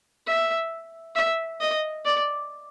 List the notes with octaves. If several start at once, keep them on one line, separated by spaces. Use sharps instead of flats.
E5
E5
D#5
D5